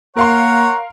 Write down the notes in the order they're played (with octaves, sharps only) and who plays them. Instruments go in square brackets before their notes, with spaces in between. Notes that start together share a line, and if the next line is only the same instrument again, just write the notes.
[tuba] A#3 [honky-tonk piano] A#4 F5 C6 [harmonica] C#5 F#5 [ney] A#5